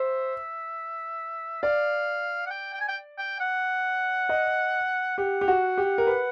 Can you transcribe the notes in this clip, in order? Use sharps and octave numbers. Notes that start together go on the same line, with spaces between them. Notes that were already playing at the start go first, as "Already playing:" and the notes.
Already playing: C5 E5
D5 F5
F#5
G5
G5
G#5
G5
G5
F#5
D#5
G4 F#5
G4
F#4
G4
A#4
B4